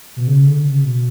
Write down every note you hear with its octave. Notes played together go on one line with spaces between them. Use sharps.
B2
C#3
D3
C#3
B2